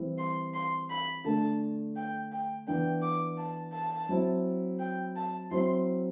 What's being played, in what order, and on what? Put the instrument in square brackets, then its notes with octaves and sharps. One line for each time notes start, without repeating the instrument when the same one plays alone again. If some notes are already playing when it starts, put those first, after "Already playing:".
Already playing: [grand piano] E3 G3 C4 E4
[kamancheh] C6
C6
B5
[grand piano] D3 A3 D4 [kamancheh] A5
[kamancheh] G5
G5
[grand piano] E3 B3 D4 [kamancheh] G5
[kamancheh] D6
A5
A5
[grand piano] F#3 C4 E4
[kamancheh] G5
A5
[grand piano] F#3 C4 E4 [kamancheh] C6